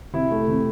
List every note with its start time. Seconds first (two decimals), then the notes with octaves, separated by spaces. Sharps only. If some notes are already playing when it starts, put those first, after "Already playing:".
0.13 C3 E4
0.31 A3
0.48 C3